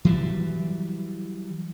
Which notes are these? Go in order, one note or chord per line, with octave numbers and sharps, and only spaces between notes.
E3 F#3 G3